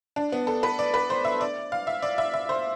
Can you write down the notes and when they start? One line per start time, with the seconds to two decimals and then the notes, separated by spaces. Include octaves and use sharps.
0.16 D4
0.32 B3
0.47 A4
0.63 B4
0.79 D5
0.94 B4
1.10 C5
1.25 E5
1.41 D5
1.72 F5
1.87 E5
2.02 D5
2.18 E5
2.34 E5
2.49 C5